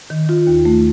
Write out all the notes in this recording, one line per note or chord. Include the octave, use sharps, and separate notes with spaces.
D#3
F4
D#2
A3